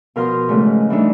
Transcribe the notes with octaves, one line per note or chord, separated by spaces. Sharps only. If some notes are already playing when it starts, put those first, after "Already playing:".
B2 F3 A#4 F5 C6 D#6
G#2 C#3 A3
E3 G3 A3 D4 D#4